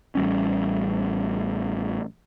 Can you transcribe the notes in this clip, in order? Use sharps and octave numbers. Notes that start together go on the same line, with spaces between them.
A1 G3 C#4